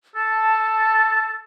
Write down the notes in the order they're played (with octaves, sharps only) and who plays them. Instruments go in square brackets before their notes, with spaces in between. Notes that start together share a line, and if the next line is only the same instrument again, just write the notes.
[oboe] A4 [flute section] A5